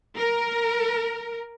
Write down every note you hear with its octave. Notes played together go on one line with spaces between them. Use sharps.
A#4